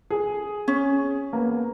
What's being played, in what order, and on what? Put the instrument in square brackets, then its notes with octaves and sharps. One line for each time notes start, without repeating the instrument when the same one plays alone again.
[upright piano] G#4
[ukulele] C#4
[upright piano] A#3 B3